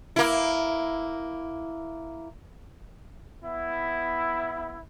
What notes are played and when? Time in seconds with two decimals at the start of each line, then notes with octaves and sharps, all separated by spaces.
0.16 A#3 E4
3.43 B3 E4